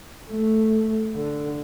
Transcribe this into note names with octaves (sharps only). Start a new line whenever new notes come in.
A3
D3